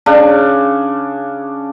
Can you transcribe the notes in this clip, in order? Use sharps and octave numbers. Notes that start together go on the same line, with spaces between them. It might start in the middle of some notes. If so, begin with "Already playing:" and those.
C#3 D4